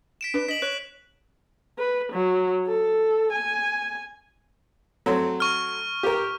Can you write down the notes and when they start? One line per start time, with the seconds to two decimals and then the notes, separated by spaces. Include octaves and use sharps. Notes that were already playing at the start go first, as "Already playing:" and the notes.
0.21 B6 D7 E7
0.34 D4 B4
0.48 D#5 B6 F#7
0.62 C#5 F#6
1.78 B4
2.12 F#3
2.67 A4
3.32 G#5
5.06 F#3 A3 C4
5.40 C#6 F6
6.03 G4 A#4